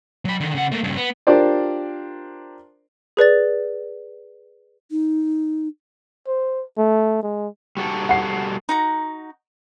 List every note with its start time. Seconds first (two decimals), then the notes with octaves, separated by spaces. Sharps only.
0.25 F#3 B5
0.40 D3 D#3
0.55 C#3 F#5
0.72 A3 A#3
0.84 G2 C#3
0.96 B3
1.27 D4 F4 G4 A#4 C5 D5
3.17 G#4 B4 D5 A6
4.91 D#4
6.27 C5
6.78 A3
7.23 G#3
7.77 G3 F#4 A4
8.09 F#5 C7
8.69 D#4 F#4 A#5